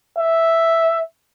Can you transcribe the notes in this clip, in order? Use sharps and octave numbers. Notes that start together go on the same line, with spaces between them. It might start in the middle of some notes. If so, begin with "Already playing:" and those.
E5